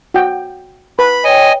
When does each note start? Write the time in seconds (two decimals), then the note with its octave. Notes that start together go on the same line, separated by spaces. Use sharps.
0.14 F#4 G5
0.99 B4 B5
1.24 C#5 D#5 G5 G#5